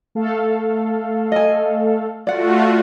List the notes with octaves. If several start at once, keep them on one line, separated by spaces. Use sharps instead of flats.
A3 A4 F5
D#5 G#5
A3 F4 F#4 D5 F#5